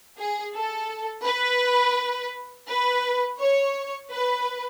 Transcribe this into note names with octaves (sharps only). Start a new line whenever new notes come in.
G#4
A4
B4
B4
C#5
B4